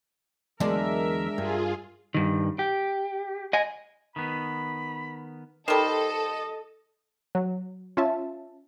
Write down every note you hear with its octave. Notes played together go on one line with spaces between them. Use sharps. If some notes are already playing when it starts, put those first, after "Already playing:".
E2 D3 F#3 G#3 D4 A#4 E5
G2 F4 G#4
G2 D#3
G4
D#5 G#5
D#3 B3 B5
D#3 G3 A4 C5 D#5
F#3
C#4 F4 E5 A5